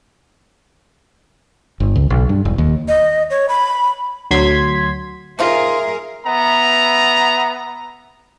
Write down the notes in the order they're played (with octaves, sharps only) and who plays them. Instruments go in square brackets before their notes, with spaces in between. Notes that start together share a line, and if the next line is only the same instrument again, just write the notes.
[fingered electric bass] G1
C#2
B1
G2
E1
D#2
[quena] D#5
C#5
B5
[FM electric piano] D2 F#3 C6 G#6 B6
[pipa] C4 D#4 F4 [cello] G#4 A#4 [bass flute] E5
[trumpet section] B3 E5 A#5